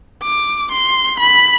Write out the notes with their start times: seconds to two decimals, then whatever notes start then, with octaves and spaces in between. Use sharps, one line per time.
0.23 D6
0.72 C6
1.20 B5